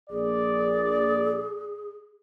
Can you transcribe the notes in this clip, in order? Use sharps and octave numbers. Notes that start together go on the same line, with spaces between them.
A#1 G#4 D5